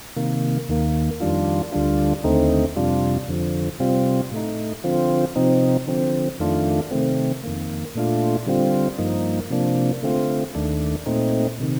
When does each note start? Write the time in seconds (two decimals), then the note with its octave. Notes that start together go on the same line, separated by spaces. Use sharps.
0.16 C3 D#3 A#3
0.69 D#2 D#3 A#3
1.20 F2 D#3 G3 D4 F4
1.72 D2 D3 G3 D4 F4
2.24 D#2 D3 A3 C4 D#4
2.76 F2 C3 G3 D4 F4
3.28 F2 D3 F3
3.80 C3 G3 C4 F4
4.31 A2 A3 D#4
4.84 D3 F3 C4 F4
5.36 C3 F3 C4 D#4
5.87 D3 F3 C4
6.39 F2 D#3 A3 D4 F4
6.91 C3 D#3 A3 C4
7.43 F2 D#3 A#3
7.95 A#2 A3 D4 F4
8.46 D3 G3 C4 F4
8.98 G2 F3 A#3 D#4
9.50 C3 F3 A#3 D4
10.03 D3 A3 C4 F4
10.55 D#2 D#3 A3 D4
11.06 A#2 A3 C4 D#4
11.60 C3 D#3